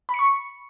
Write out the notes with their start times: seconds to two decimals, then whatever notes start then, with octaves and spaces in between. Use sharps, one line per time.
0.09 B5
0.14 C#7
0.19 C#6